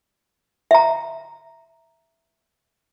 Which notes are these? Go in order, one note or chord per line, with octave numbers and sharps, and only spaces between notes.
E5 A#5